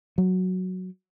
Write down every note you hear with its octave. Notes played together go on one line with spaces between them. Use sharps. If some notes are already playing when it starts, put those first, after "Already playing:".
F#3